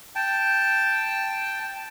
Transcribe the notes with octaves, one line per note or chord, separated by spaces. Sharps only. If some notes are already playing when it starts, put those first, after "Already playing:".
G5 A5